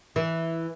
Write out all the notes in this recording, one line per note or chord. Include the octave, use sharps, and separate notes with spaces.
E3